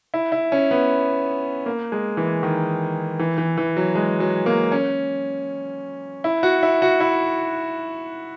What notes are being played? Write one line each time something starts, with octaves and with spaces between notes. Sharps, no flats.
E4
E4
C#4
B3
A#3
G#3
E3
D#3
E3
E3
E3
F#3
G#3
F#3
A#3
C#4
E4
F#4
E4
F#4
E4